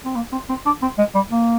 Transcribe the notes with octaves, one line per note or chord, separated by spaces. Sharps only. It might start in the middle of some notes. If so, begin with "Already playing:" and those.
C4
A#3
C4
C4
D4
C4
G#3
G3
A#3